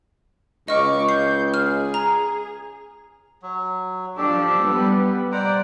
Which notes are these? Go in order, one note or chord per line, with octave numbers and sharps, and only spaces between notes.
C#2 D#5 C#6 D6 F6
G6 C7
G#4 F6
A#5
F#3
F3 D4 G4 A4
G3 B3
C5 D5 F#5 A#5